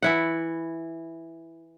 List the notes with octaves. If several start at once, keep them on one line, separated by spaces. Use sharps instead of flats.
E3 E4 F#5